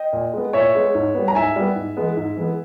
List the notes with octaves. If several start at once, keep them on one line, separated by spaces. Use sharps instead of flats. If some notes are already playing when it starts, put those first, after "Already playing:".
Already playing: D#5 G5
A#2
G#3 B3
A#2 C#5 E5
G#3 B3
G#2
G3 B3
A#5
G#2 E5 G#5
G3 B3
G#2
E3 G#3 B3
G#2
E3 G#3 B3